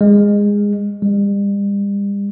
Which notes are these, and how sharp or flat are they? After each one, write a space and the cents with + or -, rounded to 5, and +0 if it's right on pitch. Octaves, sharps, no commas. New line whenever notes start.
G#3 -20
G3 +40